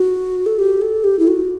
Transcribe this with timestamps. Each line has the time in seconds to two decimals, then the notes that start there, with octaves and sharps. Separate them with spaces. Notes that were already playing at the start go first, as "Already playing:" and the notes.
Already playing: F#4
0.46 A4
0.59 G4
0.82 A4
1.04 G4
1.19 E4
1.28 F#4